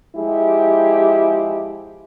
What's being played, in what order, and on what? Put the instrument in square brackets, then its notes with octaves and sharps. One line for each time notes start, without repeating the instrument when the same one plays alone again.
[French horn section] F3 G#3 E4 G4 G#4